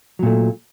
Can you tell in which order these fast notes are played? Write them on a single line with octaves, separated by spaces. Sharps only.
F#3 A#2 A3